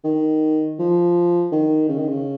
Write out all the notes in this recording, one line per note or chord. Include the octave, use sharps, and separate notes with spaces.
D#3
F3
D#3
C#3
D#3
C#3